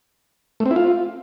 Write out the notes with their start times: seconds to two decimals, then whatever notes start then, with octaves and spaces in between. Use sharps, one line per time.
0.60 A3
0.66 C4
0.71 E4
0.76 F4